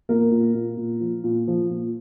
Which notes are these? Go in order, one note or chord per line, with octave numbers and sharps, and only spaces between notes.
A#2 A#3 A#4
A#2
A#2
A#2
F3
A#2
F3
A#2